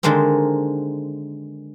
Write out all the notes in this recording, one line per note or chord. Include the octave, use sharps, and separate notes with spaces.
D3 D#3 G#3 A#3 C4